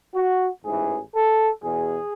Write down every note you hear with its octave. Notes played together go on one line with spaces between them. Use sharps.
F#4
A1 G#2 E3 G#4
A4
E2 B2 G#4